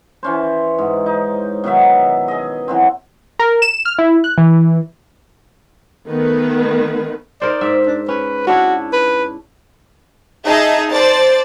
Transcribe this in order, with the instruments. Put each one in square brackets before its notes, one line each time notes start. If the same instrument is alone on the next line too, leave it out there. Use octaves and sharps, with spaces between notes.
[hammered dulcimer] E3 C#4 C5
G#2
D#4
B2 D#3 F#3 E5
G#4 D#5
E3 F#3 C4
[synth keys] A#4
E7
F6
E4
F#6
E3
[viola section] D#3 A3 B3 B4
[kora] D#4 A#4 C5 [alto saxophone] D5
[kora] G#2 E5
[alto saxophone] D4
[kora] C#4 [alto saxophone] B4
[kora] C#4 D4 E4 [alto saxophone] F#4
[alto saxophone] B4
[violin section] D#4 G#4 D#5 E5 A5
C5 D5 A5 A6